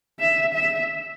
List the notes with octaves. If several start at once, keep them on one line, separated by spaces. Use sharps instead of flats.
E5
E5